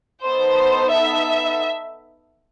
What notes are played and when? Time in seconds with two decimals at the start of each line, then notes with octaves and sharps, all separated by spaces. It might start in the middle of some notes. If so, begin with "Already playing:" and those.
0.24 B3 D#4 A4 C5
0.93 E5